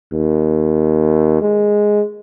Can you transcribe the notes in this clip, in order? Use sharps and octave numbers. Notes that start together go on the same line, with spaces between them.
D#2
G#3